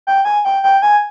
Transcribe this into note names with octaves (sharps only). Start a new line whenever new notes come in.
G5
G#5
G5
G5
G#5